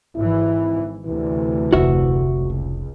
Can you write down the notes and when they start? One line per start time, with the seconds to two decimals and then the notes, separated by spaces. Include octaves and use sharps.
0.16 G#1 E3 E4
1.06 D2 C3 E3
1.73 F1 F#4 E5
2.38 C#2